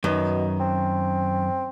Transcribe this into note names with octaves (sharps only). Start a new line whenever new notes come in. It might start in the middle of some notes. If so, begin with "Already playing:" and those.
F#2 B2 D#3
C4